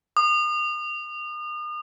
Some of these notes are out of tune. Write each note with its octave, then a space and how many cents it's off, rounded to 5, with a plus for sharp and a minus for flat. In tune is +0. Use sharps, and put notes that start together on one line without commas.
D#6 -40